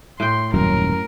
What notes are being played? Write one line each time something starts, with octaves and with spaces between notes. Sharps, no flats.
A2 G5 C6
D#1 F#2 F#3 C#4 A#4